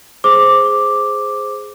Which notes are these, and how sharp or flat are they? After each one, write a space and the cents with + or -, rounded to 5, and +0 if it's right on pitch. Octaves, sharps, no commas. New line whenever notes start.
G#4 +0 C5 +0 D6 +0